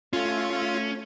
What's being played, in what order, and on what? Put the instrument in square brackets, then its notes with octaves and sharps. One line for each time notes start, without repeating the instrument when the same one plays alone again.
[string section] A3 [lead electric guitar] C#4 [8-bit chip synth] F4